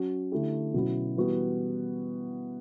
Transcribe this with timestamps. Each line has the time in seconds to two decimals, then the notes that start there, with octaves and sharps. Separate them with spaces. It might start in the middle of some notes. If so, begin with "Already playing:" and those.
Already playing: F#3 C#4 F#4
0.32 D3 A3 E4 G4
0.74 B2 F#3 C#4 E4
1.16 E3 G3 B3 F#4